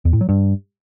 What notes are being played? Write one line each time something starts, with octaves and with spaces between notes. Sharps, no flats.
E2
A2
F#3
G2